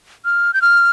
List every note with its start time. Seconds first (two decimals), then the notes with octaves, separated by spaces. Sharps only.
0.25 F6
0.54 G6
0.62 F6